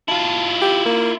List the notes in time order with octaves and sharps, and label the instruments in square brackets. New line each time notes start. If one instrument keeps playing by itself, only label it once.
[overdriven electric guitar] E4 F4 [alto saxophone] A5
[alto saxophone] G4
A#3